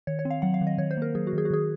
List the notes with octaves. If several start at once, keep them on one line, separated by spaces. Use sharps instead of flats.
D#3 C#5
C#5
C4
F5
F#3 F#5
F5
D#3
D#5
D#3 C#5
C5
A#3 A#4
F#3 G#4
F#4
D#3 G#4
F#4
D#3 G#4